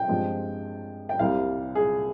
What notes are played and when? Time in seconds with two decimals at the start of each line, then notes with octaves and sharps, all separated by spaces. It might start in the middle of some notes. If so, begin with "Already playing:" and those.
Already playing: G5
0.08 G2 F3 G#3 C4
1.09 G5
1.19 C2 C3 G3 F5
1.75 G#4